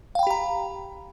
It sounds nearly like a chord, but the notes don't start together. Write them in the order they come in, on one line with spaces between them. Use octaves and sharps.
F5 G5 B5 G4 A#5